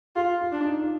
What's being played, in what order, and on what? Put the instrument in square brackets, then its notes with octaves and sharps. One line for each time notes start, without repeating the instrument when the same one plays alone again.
[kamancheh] F4 [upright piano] G4
[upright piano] F4
[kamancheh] D4
[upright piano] D#4
F4